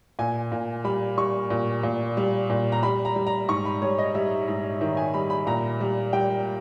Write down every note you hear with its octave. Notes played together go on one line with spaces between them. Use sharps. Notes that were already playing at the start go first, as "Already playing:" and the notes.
A#2 G#5
A#2
G3 B5
G3 C#6
A#2
A#2
G3
A#2
A#5
G3 B5
A#5
G3
A#5
G#2 C#6
B5
G3 C#5
D#5
G3 E5
G#2
D#3 E5
G#5
G3 B5
B5
A#2 A#5
G3
G3 G5